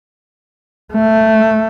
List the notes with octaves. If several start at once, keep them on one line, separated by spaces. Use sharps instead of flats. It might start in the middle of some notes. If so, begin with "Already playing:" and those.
A3